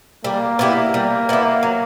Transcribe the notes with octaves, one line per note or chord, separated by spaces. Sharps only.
G3 A#3
B3 E4 G4
G3
B3 E4 G4
F#3